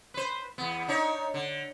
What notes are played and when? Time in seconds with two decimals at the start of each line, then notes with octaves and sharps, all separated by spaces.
0.14 B4 C5
0.58 E2 B3
0.88 D4 D#4 C#5
1.34 D3